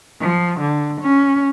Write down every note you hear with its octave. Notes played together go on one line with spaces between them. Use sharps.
F3
D3
C#4